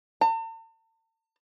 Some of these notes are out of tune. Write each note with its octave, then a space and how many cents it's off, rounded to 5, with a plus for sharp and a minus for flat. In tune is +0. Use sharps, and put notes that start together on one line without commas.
A5 +45